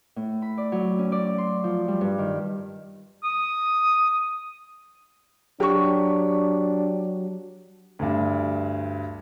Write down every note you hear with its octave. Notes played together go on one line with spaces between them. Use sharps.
A2
B5
D5
F#3
C#4
D5
C6
F3
G3
G2
D#3
D#6
F#3 D4 F#4 G4 C#6
D2 G2